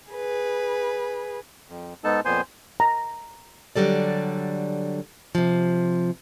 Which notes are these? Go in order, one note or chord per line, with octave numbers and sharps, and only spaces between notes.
G#4 B4
F2
G#2 G#3 B3 D#4 A4 A5
F2 A#2 B3 C5 G#5 C6
A#5
D3 F#3 G3 A4 D5
C3 F3